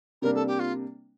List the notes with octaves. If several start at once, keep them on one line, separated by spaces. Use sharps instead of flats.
C3 G3 A#3 D4 A#4
A4
G4
F4